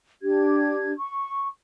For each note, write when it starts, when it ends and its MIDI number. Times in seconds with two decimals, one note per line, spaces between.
0.22 0.92 62
0.22 0.92 67
0.22 0.92 92
0.97 1.47 85